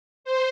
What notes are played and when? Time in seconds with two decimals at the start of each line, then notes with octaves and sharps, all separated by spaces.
0.24 C5